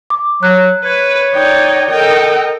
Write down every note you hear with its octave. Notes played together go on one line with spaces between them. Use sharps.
D6
F#3 F#6
B4 C#5
D#4 D5 G5
A4 A#4 D#5 G5